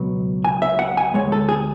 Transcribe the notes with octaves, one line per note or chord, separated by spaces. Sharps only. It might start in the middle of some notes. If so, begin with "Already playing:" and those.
Already playing: C#2 B2 F#3 B3
G#5
E5
F#5
G#5
D2 C#3 G#3 C#5
A4
G#4